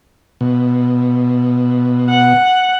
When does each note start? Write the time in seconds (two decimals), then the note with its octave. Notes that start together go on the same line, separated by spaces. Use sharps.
0.41 B2
2.09 F#5